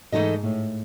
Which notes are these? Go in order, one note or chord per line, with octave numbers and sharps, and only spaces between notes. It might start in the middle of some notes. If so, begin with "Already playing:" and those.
G#2 E3 A3 D#4 A4 D#5
A2